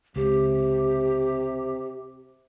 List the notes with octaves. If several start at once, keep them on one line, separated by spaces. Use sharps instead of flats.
C#2 C3 G4